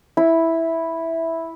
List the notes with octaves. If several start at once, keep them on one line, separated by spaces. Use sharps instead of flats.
E4